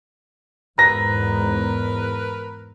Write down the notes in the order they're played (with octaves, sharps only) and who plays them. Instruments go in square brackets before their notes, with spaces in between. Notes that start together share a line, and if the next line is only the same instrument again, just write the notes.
[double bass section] E2 G#2 [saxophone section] A#4 B4 [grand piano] A#5 A#6